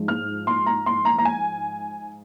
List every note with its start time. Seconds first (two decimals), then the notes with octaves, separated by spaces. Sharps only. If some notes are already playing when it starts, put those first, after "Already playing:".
Already playing: G#2 F3 G#3
0.08 F6
0.47 C6
0.66 A#5
0.86 C6
1.05 A#5
1.18 A#5
1.25 G#5